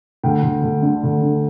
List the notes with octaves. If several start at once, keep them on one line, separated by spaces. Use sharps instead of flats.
D2 G5
D2
D2
D3
D2
D3